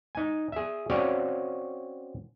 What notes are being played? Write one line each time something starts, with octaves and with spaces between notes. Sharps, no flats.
D#4 G#5
G#4 E5
C4 C#4 F#4 C#5 D5 F5